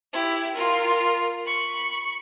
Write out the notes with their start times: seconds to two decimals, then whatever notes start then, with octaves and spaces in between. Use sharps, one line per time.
0.13 E4 G4
0.55 F4 A#4
1.46 B5 C#6